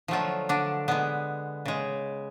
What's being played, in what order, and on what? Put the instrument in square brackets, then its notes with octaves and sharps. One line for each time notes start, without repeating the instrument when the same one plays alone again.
[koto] D3 F3 F#3 A3 F4
D3 D4
D3 G#3 B3
C#3 G#3